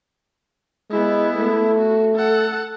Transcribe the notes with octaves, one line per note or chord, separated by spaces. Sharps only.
G#3 B3 E4
A3
F#4
A4 F#5